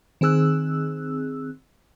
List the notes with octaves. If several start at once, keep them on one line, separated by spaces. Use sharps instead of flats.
D#3 C4 G#4 E6 F#6